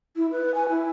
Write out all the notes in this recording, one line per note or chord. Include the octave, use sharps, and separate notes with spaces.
E4
B4
G#5
E4